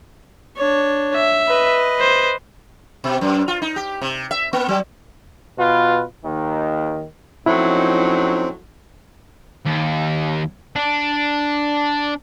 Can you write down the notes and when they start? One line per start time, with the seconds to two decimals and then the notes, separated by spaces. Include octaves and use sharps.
0.57 D4 C#5
1.15 E5
1.48 B4 D#5
2.00 C5
3.04 B2
3.21 F#2
3.48 F4
3.62 D#4
3.76 G4
4.01 C3
4.31 E5
4.53 A#3
4.68 F#3
5.58 B2 F4 B4
6.24 D#2 D#3
7.46 A2 F3 F#3 C4 C#4 D#4 E4
9.65 D#2
10.76 D4